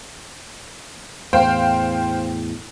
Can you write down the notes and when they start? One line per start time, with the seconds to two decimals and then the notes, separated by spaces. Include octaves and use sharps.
1.33 E2 A2 C5 F5 G5